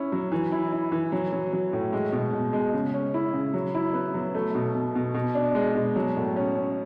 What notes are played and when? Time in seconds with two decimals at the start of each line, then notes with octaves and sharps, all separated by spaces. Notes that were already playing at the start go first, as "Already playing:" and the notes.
Already playing: C#4 E4
0.12 F#3
0.32 E3
0.52 E4
0.72 E4
0.92 E3
1.12 F#3
1.33 F#3
1.53 F#3
1.73 A2
1.93 G#3
2.12 B2
2.33 B2
2.53 G#3
2.73 C#3
2.94 C#4
3.14 E4
3.33 C#3
3.54 F#3
3.75 E4
3.94 B3
4.14 F#3
4.35 A3
4.55 B2
4.75 B2
4.95 B2
5.14 B2
5.35 D4
5.55 G#3
5.75 B2
5.96 F#3
6.16 A2
6.36 C#4
6.55 C#4